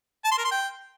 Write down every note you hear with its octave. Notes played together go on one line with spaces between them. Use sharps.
A5
C6
A#4
C6
G5